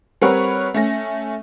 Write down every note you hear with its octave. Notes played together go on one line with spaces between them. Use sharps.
G3 C4 A#4 B4 C#5 F#5
A3 C#4 A#6